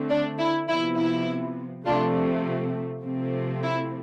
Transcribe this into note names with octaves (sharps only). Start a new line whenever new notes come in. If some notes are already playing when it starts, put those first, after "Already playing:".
Already playing: D3 A3 C4
D4
E4
C3 F3 B3 E4
E4
C3 F3 A3 C4 D4 F4
C3 F3 A3 C4
E4